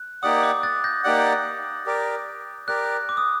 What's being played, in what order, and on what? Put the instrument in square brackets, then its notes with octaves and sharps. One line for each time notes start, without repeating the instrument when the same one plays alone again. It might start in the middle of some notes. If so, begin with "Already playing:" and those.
Already playing: [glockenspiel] F#6
[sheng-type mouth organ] A#3 D#4 G4 D5 F#5 [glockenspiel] D#6
[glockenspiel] D6
F#6 A6
G6 A#6
[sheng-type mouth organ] A#3 D#4 G4 D5 F#5
G4 A#4 D5
[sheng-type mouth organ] G4 A#4 D5 [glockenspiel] F#6
[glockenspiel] D6
D#6